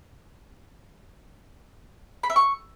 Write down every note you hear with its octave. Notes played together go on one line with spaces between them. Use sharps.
B5
E5
C#6